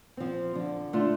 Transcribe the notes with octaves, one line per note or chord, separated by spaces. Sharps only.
F3 C4
D3
A3 D4 F4